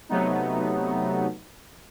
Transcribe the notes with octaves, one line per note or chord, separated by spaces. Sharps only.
C3 F#3 A3 B3 D#4